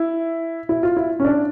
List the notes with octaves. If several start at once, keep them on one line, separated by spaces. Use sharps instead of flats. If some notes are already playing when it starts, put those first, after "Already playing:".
Already playing: E4
E4
F4
E4
C#4
D4